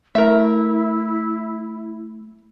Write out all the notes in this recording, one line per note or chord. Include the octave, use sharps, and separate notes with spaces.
A3 E4 A#4 E5